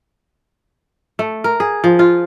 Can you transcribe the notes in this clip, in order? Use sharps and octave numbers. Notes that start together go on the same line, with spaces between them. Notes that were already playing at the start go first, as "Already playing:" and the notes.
A3
A#4
G#4
F3
F4